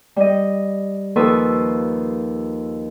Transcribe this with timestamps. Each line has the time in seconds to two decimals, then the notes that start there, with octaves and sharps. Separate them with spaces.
0.16 G3 D#5
1.16 D#2 F3 A4 B4 C#6 D#6